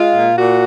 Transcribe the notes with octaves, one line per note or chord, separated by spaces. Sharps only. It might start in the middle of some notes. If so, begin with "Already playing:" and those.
Already playing: G#3 F4
A#2
A#2 F#4